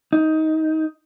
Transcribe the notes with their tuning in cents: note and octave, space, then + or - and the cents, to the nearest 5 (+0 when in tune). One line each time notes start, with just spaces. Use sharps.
D#4 +15